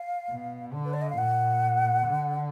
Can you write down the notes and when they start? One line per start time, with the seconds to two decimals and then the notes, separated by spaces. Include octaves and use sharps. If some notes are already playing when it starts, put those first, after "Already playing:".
Already playing: F5
0.30 B2
0.73 D3
0.85 B4
0.93 D5
1.02 D#5
1.10 F5
1.18 A#2 F#5
2.06 D3